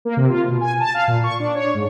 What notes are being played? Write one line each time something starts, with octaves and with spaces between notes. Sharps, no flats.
A#3
C3
F4
B2
G#5
A5
F5
A#2
C#6
D4
C#5
G#2